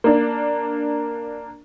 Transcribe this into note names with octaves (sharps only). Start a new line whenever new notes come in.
A#3 D4